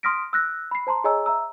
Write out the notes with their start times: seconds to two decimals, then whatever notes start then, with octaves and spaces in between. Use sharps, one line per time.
0.03 C6 D#6 F6 A#6 B6 D7
0.33 E6 F#6 A#6
0.71 B5 C7
0.87 C5 A5 A#5 C6
1.04 G#4 C#5 D#5 G#5 A#5 E6
1.26 E5 A#5 E6